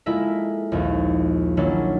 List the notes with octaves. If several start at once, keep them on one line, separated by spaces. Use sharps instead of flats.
G#3 A#3 E4 F4 A4 E5
A#1 D#2
D#3 F#3 A#3 C#4 D4 E4